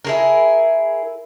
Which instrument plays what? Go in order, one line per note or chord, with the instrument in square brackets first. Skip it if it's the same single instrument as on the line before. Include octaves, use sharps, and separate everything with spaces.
[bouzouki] E4 G#4 A#4